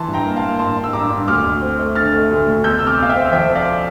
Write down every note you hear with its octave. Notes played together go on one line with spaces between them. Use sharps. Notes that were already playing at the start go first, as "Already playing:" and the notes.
Already playing: E3 A5 C6
G2
G5 A#5
A#3
F5 A5
A#3
G2 A5 C6
G2
E6
G2 A#5 D6
G2
D2 D6 F6
D2
C4
A3
D3 F6 A6
A3
D2
D2
E2 E6 G6
C3 E6
D6 F6
E2 F5
E5 G5
C4
F3 E5 G5
C4
D5 F5